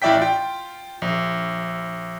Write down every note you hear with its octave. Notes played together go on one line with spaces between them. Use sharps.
A1 E4 D5 E5 G5 B6
F4 G5
A#1